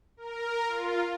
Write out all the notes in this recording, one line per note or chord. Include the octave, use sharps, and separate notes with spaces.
A#4
F4